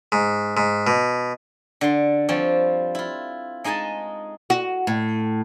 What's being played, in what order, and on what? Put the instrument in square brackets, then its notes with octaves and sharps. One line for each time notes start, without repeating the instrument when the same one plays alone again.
[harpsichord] G#2
G#2
B2
[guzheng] D3 C6
F3 G3 C4 C#5
E4 F4
G#3 D#4 D#5 G#5 A5
[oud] F#4
A2